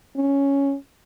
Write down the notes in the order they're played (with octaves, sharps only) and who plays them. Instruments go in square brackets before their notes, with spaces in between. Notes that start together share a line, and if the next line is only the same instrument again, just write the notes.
[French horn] C#4